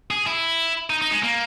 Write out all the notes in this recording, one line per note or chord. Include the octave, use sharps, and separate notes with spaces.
G#4
E4
D#4
D#4
G#3
A#3